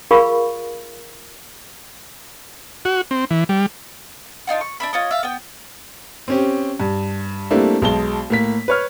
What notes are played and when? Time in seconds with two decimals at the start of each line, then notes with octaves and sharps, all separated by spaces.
0.11 F4 G#4 A#4 F5 B5 C#6
2.85 F#4
3.11 C4
3.31 E3
3.49 G3
4.47 D4 D#4 F4 F#4
4.61 C#6
4.80 D4 E5 B5
4.93 F4 C#5 D#5
5.11 E5 F5
5.23 B3 G5
6.28 C4 C#4 G4
6.80 G2
7.51 G3 A3 A#3 C4 D4 E4
7.82 B1 G#3 A5 G7
8.30 A2 A#3 B6
8.68 B4 C#5 F6